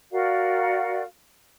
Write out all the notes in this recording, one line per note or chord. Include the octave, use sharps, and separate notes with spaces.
F#4 A#4 D5 F5